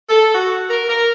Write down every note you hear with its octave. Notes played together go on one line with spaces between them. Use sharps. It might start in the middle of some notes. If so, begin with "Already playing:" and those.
A4
F#4
A#4
A#4